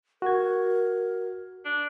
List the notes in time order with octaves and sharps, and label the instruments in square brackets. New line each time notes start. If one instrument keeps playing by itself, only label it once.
[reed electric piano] F#4 G#6 [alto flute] A#4
[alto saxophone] D4